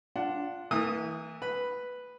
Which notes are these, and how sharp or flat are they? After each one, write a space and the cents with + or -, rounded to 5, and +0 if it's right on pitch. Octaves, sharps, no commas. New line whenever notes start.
D4 +0 F4 +0 F#5 +25
E3 -20 A3 +45 D#6 -10
B4 +0 B5 +0